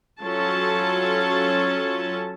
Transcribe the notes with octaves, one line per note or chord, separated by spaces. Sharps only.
F#3 C#4 F4 A4 A5